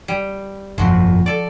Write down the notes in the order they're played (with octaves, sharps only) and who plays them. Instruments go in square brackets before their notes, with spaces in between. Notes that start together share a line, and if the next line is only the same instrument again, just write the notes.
[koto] G3
[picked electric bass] G1 F2 A#2 [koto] F3 F#4
[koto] A4 D5